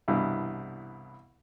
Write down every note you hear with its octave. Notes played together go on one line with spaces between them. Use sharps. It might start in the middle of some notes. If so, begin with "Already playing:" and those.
C2 G2 B2 E3